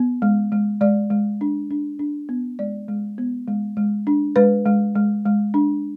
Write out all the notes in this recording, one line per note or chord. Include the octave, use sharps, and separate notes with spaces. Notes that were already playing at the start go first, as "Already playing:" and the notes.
Already playing: B3
G#3
G#3
G#3 D5
G#3
D4
D4
D4
B3
G#3 D5
G#3
B3
G#3
G#3
D4
G#3 B4
G#3
G#3
G#3
D4